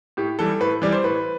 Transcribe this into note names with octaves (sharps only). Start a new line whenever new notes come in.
A2 G4
E3 G3 A4
A2 B4
E3 G3 D5
C5
A2 B4